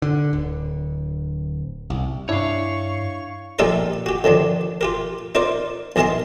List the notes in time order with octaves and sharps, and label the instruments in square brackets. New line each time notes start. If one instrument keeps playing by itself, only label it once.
[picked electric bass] D3
D1
C2
[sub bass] G2 [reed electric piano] D4 E4 [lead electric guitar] C#5 F5 [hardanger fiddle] C#6
[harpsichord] A#1 G3 D#4 A4 A#4 A#5
F#4 G4
D3 D#3 F3 D4
F4 G4 A#4
D#4 F4 A#4 C5 D5
B1 E3 A#4 D#5 A5 C6